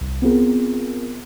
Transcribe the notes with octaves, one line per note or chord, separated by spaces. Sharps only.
C2
B3 C4 F4 G#4 A#4